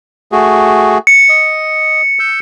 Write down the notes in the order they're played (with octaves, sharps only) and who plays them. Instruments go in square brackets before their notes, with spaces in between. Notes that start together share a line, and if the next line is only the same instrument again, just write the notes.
[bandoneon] A3 F#4 G#4
[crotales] C#7
[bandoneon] D#5
E6 G6